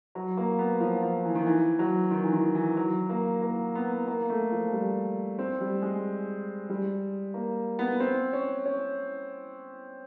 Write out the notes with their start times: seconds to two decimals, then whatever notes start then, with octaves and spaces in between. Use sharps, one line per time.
0.15 F#3
0.37 A#3
0.59 B3
0.80 F3
1.02 F3
1.25 E3
1.35 D#3
1.46 E3
1.79 F#3
2.11 D#3
2.24 E3
2.33 D#3
2.55 E3
2.77 F#3
3.09 A#3
3.42 A#3
3.75 B3
4.08 A#3
4.29 A3
4.51 F3
4.73 G3
5.39 C4
5.61 G3
5.82 G#3
6.70 G3
7.34 A#3
7.79 B3
8.00 C4
8.33 C#4
8.65 C#4